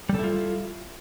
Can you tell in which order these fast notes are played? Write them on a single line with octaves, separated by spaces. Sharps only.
G3 A4 E4 F4